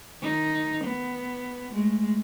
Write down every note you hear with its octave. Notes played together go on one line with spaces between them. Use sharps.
D#3 D#4
B3
G#3 A3